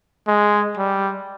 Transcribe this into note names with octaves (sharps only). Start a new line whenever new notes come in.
G#3
G3